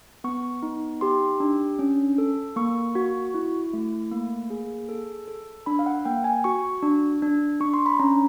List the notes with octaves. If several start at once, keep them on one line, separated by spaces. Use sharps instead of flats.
B3 C#6
D#4
G4 C6
D4
C#4
A4
A#3 C#6
F#4
E4
A3
A#3
G#4
A4
A4
D4 B5
F5
F#5
A#3 G5
G#5
F#4 C#6
D4
D4
D4 C#6
C6
B5
C#4 A#5